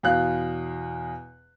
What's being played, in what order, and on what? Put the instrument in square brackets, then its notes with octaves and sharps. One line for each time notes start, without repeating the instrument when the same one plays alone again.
[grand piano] E2 B2 F5 F#6